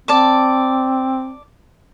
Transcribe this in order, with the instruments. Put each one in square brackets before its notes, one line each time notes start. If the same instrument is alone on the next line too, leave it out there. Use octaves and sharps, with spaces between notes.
[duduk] C4 [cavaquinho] D5 A5 D6